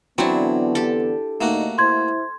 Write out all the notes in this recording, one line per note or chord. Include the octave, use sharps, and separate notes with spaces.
D3 E3 F#3 B3 C4 D4 E4
G4 A4
D2 A2 A3 A#3 D#4 F#4
E4 C5 C6 G#6